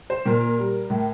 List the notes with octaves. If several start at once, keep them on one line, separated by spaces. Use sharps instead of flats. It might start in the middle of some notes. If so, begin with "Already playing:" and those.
C5
A#2 A#4
G3
A2